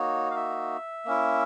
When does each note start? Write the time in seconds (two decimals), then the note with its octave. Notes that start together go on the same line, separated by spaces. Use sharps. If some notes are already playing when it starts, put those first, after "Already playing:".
Already playing: A#3 D#4 F#4 C#5
0.31 F5
0.36 E5
1.05 A#3 C#4 E4